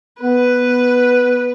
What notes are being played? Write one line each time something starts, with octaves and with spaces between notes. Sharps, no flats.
B3 B4